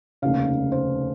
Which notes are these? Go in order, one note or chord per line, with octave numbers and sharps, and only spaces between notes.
F1 D#2 C#3 F5
C5